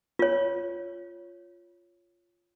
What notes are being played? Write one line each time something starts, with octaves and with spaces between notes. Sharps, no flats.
F4 C#5